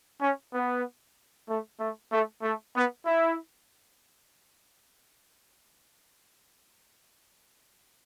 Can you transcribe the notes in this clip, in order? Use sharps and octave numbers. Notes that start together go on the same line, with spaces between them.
C#4
B3
A3
A3
A3
A3
B3
E4